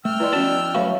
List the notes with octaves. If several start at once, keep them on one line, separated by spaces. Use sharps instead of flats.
A3 G5 E6 F6
E4 B4 D5 D#5 C6
F3 B3 C#4 F#4 D5 A5
F#3 A3 F#4 B4 C#5 E5 F5 B5